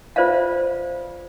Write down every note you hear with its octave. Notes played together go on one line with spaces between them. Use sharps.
F4 B4 C5 D5 E5 F5